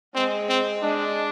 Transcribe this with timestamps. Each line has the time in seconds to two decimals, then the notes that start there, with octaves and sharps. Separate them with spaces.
0.15 G#3 C4
0.49 C4
0.82 G#3 D4